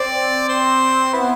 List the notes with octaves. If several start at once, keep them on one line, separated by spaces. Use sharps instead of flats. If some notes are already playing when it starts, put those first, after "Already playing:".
Already playing: C4 D5
C5
B3 E4